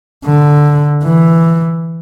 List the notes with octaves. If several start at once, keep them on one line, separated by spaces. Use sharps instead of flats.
D3
E3